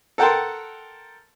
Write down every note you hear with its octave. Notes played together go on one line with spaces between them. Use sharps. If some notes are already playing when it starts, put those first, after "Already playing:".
A4 A#4 F#5 G5 A5 C6